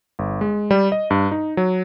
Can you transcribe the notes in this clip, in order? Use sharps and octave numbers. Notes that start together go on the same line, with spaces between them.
G1
G#3
G3
D#5
G2
D#4
F#3